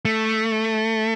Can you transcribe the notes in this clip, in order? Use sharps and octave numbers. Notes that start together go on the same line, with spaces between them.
A3